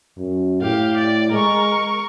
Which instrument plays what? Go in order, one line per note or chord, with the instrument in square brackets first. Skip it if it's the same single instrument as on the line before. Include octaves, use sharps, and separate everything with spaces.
[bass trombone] F#2
[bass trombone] A2 [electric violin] G4 F5
[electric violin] D5
[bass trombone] G#3 [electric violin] A#4 C#6